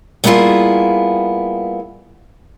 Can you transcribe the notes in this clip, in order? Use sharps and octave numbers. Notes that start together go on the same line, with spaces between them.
G3 A#3 B3 E4 F4 G#4